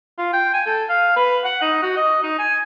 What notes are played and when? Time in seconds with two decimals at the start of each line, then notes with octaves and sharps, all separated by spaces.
0.18 F4
0.33 G5
0.54 G#5
0.66 A4
0.89 F5
1.16 B4
1.44 F#5
1.62 D#4
1.83 F#4
1.97 D#5
2.23 D#4
2.39 G#5